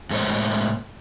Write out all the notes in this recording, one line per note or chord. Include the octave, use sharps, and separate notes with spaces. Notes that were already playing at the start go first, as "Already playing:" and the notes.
A2 G#3 A#3 A4 C5 C#5